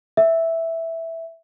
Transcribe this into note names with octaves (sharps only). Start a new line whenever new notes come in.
E5